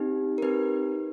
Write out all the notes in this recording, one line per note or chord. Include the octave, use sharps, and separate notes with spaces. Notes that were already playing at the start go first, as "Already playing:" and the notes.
Already playing: C4 D#4 G4
A#4
C4 D#4 G4 B4